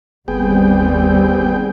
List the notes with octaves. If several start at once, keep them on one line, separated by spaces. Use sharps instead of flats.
G1 D#2 G3 B3 C4 G#4 G5